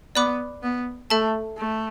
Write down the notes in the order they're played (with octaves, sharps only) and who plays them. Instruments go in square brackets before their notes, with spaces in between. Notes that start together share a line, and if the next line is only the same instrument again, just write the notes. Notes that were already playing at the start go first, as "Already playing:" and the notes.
[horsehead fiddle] B3 [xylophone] D5 B5 D6 F#6
[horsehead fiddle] B3
[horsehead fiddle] A3 [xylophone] A4 E5 A5
[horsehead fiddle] A3